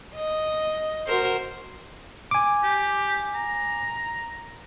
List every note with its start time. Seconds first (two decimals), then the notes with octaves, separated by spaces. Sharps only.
0.14 D#5
1.07 F#4 A#4 C5
2.31 G#5 D6
2.63 G4
3.35 A#5